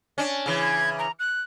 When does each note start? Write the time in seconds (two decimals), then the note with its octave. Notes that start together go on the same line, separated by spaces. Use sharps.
0.18 C#4 D4
0.46 C#3 E3
0.62 G#6
0.99 A#5
1.19 F#6